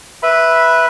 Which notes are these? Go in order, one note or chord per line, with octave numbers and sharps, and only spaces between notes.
B4 E5 B5